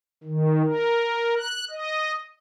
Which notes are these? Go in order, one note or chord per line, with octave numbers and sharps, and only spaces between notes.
D#3
A#4
F#6
D#5